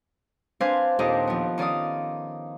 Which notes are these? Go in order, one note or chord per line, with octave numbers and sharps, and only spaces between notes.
C4 D4 B4 C5 F5 G#5
D#2 A#2 C4 G4 A4 D#5
F3 B3
D#3 C#4 D5 F5 D#6